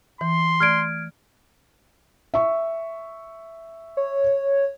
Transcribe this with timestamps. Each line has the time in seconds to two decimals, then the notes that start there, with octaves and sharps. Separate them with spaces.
0.21 E3 C6
0.60 A3 D5 F6 G#6 D7
2.34 E5 C#6
3.97 C#5